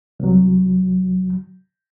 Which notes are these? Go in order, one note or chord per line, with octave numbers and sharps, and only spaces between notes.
C2 F#3